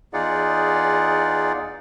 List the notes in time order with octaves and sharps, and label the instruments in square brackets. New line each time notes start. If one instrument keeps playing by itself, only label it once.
[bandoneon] E2 D#4 F4 G#4 D5 F#5